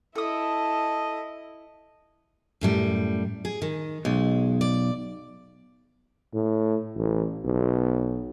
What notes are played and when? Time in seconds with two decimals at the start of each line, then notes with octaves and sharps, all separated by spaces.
0.15 E4 A4 D#5 D#6
2.61 F#2 A2 G3
3.45 G#4
3.62 D#3
4.05 B1 G#3
4.61 D5
6.34 A2
6.95 A1
7.45 B1